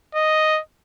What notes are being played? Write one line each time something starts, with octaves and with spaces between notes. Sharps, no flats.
D#5